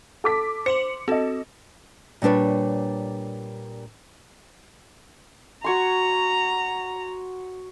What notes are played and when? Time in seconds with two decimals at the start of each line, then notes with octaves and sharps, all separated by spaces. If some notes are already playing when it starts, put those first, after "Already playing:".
0.24 A4 D6 B6
0.66 C5 C6 C#7 F#7
1.08 C4 F#4 A4 D#5
2.22 A#2 G3 D4 B4 C#5
5.64 F#4 C#5 A#5 C6